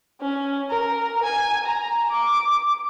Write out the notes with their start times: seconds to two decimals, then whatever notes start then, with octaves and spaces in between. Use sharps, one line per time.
0.21 C#4
0.70 A#4
1.23 G#5
1.66 A#5
2.11 D6